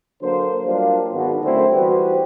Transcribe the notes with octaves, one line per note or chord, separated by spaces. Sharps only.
D3 F#3 A#3 D4 C5
F#3 G3 A#3 D4 F4
G#1 B2
F#2 D3 A3 C4 E4 C5
E3 G3 F#4 G4 B4 C5